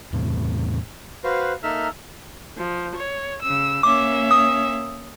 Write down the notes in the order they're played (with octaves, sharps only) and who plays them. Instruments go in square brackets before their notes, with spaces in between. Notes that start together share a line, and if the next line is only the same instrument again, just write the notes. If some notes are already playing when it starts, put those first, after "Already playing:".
[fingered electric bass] E2 A2 C3
[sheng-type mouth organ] F#4 B4 C5 F5
A#3 D#4 A4 E5 E6 F6
[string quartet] F3
C#5
C#3 E6
[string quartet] A#3 C#4 E5 [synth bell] D6
[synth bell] D#6